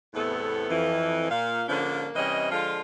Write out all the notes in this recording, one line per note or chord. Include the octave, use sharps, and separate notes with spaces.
E2 A2 C3 B3 A4
F2 E3
A#2 F5
G#2 D3 F3 A#3 C#4 D4
C3 E3 G3 C#4 D#5
D3 F3 G#3 F4